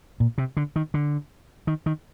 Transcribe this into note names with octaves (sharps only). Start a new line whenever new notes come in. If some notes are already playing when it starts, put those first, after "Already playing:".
A#2
C3
D3
D#3
D3
D#3
D#3